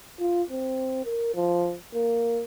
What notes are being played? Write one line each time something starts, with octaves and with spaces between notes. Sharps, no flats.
F4
C4
A#4
F3
A#3